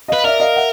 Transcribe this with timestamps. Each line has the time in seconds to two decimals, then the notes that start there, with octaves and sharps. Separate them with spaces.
0.08 B4 D#5 F5
0.24 A#4 D5 E5
0.40 D#5 F5
0.56 E5 F#5